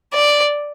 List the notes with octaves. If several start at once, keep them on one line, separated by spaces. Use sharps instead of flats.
D5